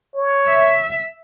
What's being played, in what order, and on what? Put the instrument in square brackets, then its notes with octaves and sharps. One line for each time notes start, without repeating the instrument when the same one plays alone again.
[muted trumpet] C#5
[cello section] E5